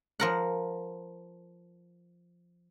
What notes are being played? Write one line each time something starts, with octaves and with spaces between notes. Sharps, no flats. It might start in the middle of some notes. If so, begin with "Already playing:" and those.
F3 A#4 F#5